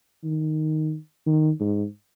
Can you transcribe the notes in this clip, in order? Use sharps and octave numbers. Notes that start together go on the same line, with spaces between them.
D#3
D#3
G#2